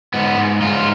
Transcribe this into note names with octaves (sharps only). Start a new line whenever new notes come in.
G#2 B3
G#2
G#2 F4